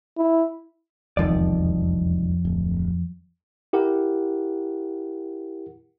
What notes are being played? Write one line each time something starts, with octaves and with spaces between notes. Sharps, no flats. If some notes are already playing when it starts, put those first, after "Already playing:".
E4
E1 C2 F2 D#3 F3 D5
D1
E4 G4 A#4 F#5